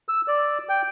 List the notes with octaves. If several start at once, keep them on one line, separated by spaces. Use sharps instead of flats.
E6
D5
G5